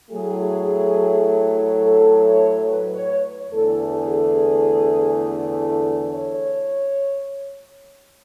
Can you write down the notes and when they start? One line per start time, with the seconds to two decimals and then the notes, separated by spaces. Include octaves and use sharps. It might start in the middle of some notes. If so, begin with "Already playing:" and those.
0.11 A2 F#3 A3 G#4
1.81 A4
2.24 C#5
2.67 B4
2.94 C#5
3.51 E2 D3 A3 A4
3.94 G#4
6.06 C#5